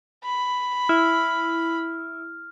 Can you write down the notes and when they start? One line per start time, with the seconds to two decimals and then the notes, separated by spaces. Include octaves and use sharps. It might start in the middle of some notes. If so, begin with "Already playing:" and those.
0.24 B5
0.89 E4 F6